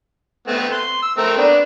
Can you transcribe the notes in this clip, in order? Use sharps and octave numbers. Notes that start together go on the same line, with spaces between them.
A3 B3 C4
C6
E6
A3 C4 A#4
B3 D4